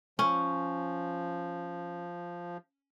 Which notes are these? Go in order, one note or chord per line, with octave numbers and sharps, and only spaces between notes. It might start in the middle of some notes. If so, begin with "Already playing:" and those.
F3 C#4